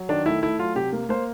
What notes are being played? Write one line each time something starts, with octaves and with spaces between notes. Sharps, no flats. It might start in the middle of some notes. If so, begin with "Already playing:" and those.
Already playing: F#3
D#3 D4
A3 E4
A3 E4
F#3 F4
C3 G4
A#3
A#3 C5